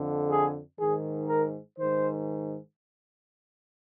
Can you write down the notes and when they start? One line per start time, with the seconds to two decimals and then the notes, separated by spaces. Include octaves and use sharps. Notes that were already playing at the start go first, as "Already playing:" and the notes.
Already playing: F2 D3
0.30 G#4
0.79 G#2 D#3 G#4
1.28 A#4
1.78 G#2 D#3 C5